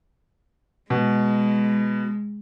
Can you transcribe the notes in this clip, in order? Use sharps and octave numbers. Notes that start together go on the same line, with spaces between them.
B2 G#3